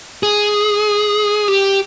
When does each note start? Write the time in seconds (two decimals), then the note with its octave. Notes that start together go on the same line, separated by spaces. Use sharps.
0.23 G#4
1.48 G4